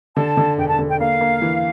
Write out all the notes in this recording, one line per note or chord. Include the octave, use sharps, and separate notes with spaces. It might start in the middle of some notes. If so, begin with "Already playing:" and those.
D3 A5
D3
E1 G5
A5
D3
G5
A#3 F5
A#3
E3